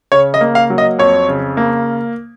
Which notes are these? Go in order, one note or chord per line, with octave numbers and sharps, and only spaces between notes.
C#3 C#5
D#5
A#3
F5
F#3
D#5
F2 C#5
C#3
A#3